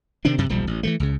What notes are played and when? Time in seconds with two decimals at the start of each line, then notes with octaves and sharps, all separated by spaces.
0.25 C3 D#3 C4 D4
0.38 F#2 C3
0.49 D#1 B1 F3 G3
0.67 A1
0.83 E3 F3 A3
1.00 C#2 C#3